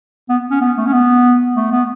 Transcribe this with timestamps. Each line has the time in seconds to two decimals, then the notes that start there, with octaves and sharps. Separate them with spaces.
0.29 B3
0.51 C#4
0.61 B3
0.77 A3
0.87 C#4
0.93 B3
1.56 A3
1.72 B3